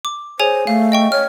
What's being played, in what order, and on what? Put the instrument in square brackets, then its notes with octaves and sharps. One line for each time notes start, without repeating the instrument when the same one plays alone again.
[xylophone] D6
[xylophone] G#4 C#5 G#5 [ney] C5
[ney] A3 [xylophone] F5
[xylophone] D#5 G5 C#6
[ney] C#5 [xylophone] F6